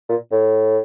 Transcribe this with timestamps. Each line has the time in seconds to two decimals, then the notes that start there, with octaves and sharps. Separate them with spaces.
0.09 A#2
0.31 A2